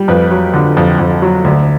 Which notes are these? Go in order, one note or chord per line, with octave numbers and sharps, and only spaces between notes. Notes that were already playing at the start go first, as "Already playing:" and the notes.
Already playing: G3
F2 B4
F#3
D3
F2
F2
F#3
D2